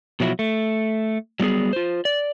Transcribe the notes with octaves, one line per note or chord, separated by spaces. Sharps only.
B2 F3 F#3 E4 F#4
A3
F#3 G3 B3 E4 G#4
F4 C5
D5